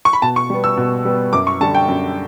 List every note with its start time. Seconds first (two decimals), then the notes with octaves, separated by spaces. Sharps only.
0.05 C#6
0.13 B5
0.22 B2 A5
0.36 C#6
0.50 G3 B3
0.64 E6
0.77 B2
1.05 G3 B3
1.33 F#2 D6
1.47 C#6
1.61 D3 G3 A5
1.75 G5
1.88 F#2